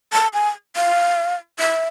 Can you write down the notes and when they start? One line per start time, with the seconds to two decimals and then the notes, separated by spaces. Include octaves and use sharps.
0.13 A5
0.33 G#5
0.76 F5
1.59 E5